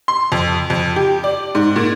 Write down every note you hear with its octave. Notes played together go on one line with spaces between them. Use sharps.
C6
F2
F2
G4
D5
G#2
A#2